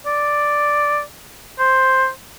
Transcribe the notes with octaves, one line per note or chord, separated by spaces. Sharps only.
D5
C5